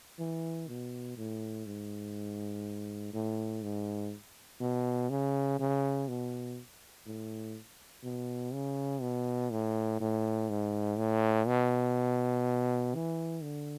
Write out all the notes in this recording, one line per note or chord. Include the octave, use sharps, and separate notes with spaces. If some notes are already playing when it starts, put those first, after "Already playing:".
E3
B2
A2
G#2
A2
G#2
B2
C#3
C#3
B2
A2
B2
C#3
B2
A2
A2
G#2
A2
B2
E3
D3